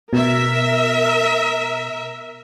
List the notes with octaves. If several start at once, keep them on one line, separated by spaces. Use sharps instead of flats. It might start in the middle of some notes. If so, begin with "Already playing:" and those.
B2 A#4 E5